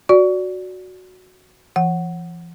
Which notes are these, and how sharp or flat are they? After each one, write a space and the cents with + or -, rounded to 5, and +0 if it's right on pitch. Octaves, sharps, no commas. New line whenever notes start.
F#4 -5 D5 -10
F3 -45 F#5 +5